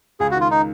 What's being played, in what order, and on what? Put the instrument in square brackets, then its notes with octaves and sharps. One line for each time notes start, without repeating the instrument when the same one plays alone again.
[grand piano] C#2 [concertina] G#4
[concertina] F#4
[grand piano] D#3 [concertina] F4
[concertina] D#4